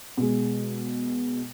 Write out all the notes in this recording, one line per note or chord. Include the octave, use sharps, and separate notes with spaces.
B2 G#3